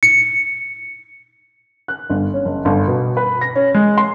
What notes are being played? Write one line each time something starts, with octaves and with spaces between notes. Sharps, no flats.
C#7
F#6
G1
C#4
F#1
G1
B2
B4
A#6
C#4
G#3
C6